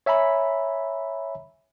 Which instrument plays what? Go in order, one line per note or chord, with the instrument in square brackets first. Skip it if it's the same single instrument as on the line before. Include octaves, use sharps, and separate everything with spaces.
[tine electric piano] C#5 E5 G#5 A#5 B5